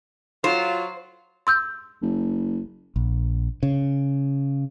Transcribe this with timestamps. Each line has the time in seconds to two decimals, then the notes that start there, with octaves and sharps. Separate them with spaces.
0.44 F#3 F4 C5
1.47 C6 E6 G6
2.02 F#1
2.96 A#1
3.63 C#3